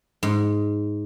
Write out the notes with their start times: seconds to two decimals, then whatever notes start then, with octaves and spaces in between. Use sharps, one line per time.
0.23 G#2